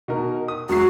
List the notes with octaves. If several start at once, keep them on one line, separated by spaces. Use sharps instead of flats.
B2 D#4 A#4
D#6
F#2 G#3 F#4 C7